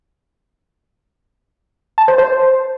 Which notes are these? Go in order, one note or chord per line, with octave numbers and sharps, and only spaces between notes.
A5
C5
C5